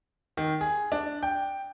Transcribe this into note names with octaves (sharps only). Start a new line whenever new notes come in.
D#3
G#4
D4
G5